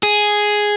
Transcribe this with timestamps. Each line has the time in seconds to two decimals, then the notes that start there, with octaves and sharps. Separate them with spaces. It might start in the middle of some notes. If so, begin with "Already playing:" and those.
0.03 G#4